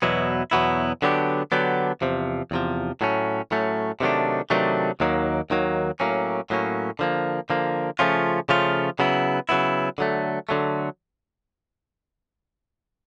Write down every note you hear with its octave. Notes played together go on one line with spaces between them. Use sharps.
E2 B2 F#3 B3 E4
E2 B2 F#3 B3 E4
D3 F#3 B3 D4 G4
D3 F#3 B3 D4 G4
E2 C3 F3
E2 C3 F3
A2 F#3 A3 C#4
A2 F#3 A3 C#4
C3 D#3 F#3 A3 D4
C3 D#3 F#3 A3 D4
D#2 D#3 F#3 A#3
D#2 D#3 F#3 A#3
A2 F#3 A#3 C#4
A2 F#3 A#3 C#4
D3 F3 A#3
D3 F3 A#3
C#3 F3 A3 C#4 F4
C#3 F3 A3 C#4 F4
C#3 F#3 B3 E4
C#3 F#3 B3 E4
D3 F#3 A3
D3 F#3 A3